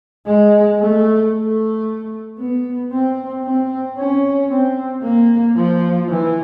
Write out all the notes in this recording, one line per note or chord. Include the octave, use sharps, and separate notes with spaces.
G#3
A3
A3
B3
C4
C4
C#4
C4
A#3
F3
E3